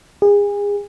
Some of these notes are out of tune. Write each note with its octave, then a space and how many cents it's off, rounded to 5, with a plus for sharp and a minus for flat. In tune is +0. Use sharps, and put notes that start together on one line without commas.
G#4 -30